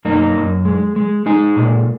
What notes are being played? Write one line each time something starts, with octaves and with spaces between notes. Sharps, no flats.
F#2 A#3 D#4
F#2
G#3
G#3
G#3 D#4 G#4
A#2